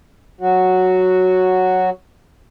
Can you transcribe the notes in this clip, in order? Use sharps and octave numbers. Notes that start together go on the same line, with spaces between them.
F#3 F#4